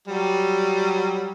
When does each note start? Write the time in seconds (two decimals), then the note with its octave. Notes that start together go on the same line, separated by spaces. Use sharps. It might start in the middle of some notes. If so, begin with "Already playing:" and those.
0.08 F#3 G3